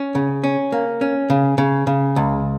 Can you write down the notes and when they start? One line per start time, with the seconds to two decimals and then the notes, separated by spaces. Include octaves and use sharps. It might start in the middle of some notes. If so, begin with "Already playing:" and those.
Already playing: C#4
0.15 C#3
0.44 C#4
0.72 A#3
1.01 C#4
1.30 C#3
1.58 C#3
1.87 C#3
2.16 C#2